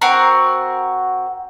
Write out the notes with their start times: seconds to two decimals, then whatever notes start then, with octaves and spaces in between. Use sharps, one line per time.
0.01 C4 F#4 A#4 C6